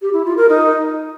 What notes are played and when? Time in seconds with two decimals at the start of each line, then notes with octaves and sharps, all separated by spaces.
0.01 G4
0.13 E4
0.25 F4
0.37 A#4
0.49 D#4